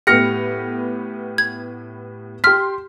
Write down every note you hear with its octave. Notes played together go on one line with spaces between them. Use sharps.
A2 B3 G4 F6 A#6 C#7
G#6
G4 C6 F6 B6